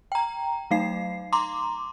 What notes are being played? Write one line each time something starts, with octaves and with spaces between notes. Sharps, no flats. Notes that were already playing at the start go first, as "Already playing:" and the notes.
G5 A#5
F#3 A3 D#4 F5 C7
A#5 C6 D6